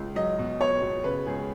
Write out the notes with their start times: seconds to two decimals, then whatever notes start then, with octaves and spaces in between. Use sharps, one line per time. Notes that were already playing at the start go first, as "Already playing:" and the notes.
Already playing: C#2
0.15 F#3 D#5
0.38 B2
0.60 B3 C#5
0.82 B2
1.04 C#3 B4
1.26 C#2 G#4